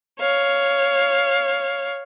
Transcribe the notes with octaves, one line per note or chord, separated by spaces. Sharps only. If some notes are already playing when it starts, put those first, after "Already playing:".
C#5 F5